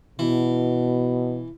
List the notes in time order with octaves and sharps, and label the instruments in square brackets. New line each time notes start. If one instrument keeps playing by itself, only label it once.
[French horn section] B2 [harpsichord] E3